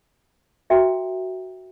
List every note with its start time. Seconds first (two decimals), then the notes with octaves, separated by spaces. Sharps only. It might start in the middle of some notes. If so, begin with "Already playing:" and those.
0.70 F#4 A#4 E5 G5 A#5